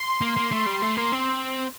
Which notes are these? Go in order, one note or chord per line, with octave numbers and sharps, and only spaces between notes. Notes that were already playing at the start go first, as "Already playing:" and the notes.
Already playing: C6
A#3
A#3
A3
G3
A3
A#3
C4